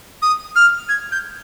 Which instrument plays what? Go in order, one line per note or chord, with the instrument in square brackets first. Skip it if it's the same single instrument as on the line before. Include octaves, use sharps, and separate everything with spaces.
[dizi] D#6
F6
G#6
G6